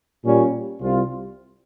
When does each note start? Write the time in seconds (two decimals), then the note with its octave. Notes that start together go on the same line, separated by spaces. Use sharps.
0.23 A#2 G3 C#4
0.81 C2 C3 G3 C4 F4